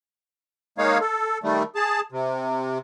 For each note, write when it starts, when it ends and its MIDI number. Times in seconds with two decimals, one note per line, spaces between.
0.78 0.98 56
0.78 0.98 58
0.78 0.98 63
0.78 0.98 73
0.78 0.98 77
1.01 1.38 69
1.44 1.63 51
1.44 1.63 55
1.44 1.63 57
1.75 2.01 68
1.75 2.01 81
2.12 2.78 48